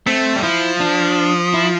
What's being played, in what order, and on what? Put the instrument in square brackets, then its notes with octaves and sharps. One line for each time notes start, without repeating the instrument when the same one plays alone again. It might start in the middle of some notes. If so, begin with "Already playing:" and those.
[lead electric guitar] A3 [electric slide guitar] C4
[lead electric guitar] G3
[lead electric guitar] F3 [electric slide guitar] E4
[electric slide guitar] D4
E4